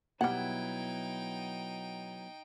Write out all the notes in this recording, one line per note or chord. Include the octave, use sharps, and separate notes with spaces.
B2 F#3 G3 B3 D#4 E4 F#5 G5